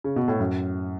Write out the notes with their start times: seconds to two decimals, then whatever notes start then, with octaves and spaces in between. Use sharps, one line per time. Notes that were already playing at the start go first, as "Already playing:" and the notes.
0.04 C#3
0.16 B2
0.28 A2
0.40 F#2